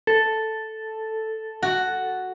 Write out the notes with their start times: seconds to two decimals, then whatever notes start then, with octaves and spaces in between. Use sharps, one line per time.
0.07 A4
1.62 F#4